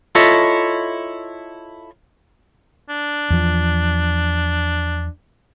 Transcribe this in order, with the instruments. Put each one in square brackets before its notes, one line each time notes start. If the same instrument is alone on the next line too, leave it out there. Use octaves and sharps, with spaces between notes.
[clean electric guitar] E4 F4 A4 C#5 D#5 E5
[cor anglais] D4
[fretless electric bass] E2 F3